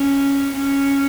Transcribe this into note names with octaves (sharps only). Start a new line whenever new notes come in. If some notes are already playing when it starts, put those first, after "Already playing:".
Already playing: C#4
C#4